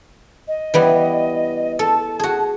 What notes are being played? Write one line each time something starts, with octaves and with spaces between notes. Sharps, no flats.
D#5
E3 G3 B3
A4 A5
F#4 G#4